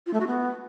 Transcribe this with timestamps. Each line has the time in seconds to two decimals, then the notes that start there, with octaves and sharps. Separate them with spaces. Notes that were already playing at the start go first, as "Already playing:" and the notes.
0.06 F4
0.13 A3
0.20 F#4
0.27 B3